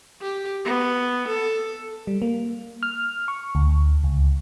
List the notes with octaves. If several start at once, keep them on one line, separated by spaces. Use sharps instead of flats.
G4
B3
A4
G3
A#3
F6
C#6
D2
C#2